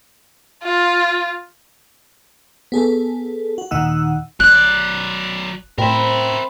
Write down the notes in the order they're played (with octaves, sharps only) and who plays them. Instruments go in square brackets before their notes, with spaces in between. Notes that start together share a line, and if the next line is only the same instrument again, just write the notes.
[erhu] F4
[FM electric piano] B3 G#4 A4
F#4
D#2 A#2 D#3 D#4 F#5 E6
[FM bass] G1 [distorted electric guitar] F#3 D5 [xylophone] F#6
[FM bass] A2 [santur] C4 B5 [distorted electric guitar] A#4 E5